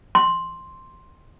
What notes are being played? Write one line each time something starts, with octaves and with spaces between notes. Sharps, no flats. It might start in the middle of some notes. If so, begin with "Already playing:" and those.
C6